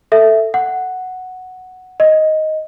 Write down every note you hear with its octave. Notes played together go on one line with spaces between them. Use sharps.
A4 E5
F#5
D#5